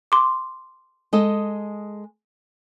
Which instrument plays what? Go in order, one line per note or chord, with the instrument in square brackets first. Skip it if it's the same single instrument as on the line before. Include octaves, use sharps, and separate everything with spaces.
[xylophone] C6 D6
[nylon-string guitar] G#3 A4 D#5